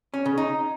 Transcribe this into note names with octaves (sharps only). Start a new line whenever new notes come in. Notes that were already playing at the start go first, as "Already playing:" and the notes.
C#4
C#3
D#4